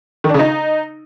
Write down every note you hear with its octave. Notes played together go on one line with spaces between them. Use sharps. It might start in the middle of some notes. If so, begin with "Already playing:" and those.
D#3
D4
C#3
D#4